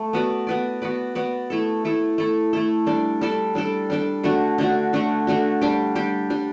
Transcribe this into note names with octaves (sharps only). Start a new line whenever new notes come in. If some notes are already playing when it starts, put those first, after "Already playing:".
Already playing: A3
B3 F#4 B4 D5
B3 F#4 B4 D5
B3 F#4 B4 D5
B3 F#4 B4 D5
A3 E4 A4
A3 E4 A4
A3 E4 A4
A3 E4 A4
G3 D4 A4 D5
G3 D4 A4 D5
G3 D4 A4 D5
G3 D4 A4 D5
D3 A3 D4 F#4
D3 A3 D4 F#4
D3 A3 D4 F#4
D3 A3 D4 F#4
G3 D4 G4
G3 D4 G4
G3 D4 G4